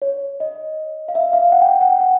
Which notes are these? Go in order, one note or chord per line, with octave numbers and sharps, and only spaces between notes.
C#5
D#5
F5
E5
F5
F#5
G5
F#5
G5
F#5